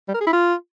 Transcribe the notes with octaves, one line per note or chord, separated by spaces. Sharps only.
G3
A#4
G#4
E4
F4